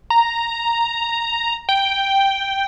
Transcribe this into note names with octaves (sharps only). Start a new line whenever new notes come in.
A#5
G5